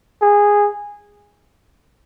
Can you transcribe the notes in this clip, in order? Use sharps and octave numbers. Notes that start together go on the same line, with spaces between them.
G#4